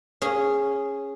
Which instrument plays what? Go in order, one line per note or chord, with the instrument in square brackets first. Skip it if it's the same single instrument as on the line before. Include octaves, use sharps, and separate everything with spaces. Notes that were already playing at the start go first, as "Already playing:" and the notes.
[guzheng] C#4 G#4